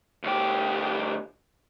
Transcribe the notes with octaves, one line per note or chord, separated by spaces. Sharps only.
D2 G4